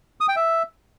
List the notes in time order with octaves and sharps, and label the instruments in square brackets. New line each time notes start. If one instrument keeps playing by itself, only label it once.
[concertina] D#6
G5
E5